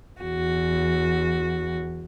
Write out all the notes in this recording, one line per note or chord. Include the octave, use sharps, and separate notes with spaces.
E2 F#4